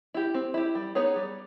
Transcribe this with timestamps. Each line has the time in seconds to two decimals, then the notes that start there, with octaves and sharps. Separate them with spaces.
0.14 E4 G4
0.34 C4
0.54 E4 G4
0.75 G3
0.95 B3 D#4 G#4 C#5
1.16 G3